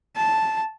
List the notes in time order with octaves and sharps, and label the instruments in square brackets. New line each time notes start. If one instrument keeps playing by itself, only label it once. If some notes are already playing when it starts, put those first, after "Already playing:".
[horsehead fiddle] A5